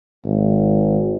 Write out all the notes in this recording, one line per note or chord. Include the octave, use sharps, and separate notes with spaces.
G#1